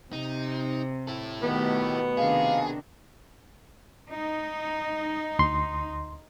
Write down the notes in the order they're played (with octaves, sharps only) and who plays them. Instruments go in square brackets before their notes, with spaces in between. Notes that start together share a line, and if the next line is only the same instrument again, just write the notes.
[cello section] C3 [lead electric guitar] D#4
[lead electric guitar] E4 A4
[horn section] B2 B3 [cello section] D#3 A3 G4
[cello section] C3 D#3 D4 [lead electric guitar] G#4 [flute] F5
[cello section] D#4
[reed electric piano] D2 C6